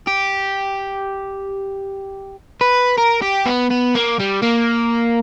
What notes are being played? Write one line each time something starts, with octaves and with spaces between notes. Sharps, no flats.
G4
B4
A#4
G4
B3
B3
A#3
G3
A#3